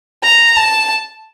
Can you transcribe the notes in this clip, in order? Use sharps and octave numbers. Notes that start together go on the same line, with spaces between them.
A#5
A5